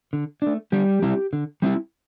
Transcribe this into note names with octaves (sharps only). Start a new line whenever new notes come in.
D3
A3 D4
D3 G3 G4
G3 C4 E4
D3
G3 C4 E4